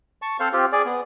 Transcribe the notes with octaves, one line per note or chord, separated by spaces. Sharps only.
A5 C#6
C4 A4 C5 F5
C4 F4 G4
G#4 D5
B3